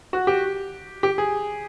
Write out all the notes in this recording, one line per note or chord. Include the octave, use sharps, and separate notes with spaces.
F#4
G4
G4
G#4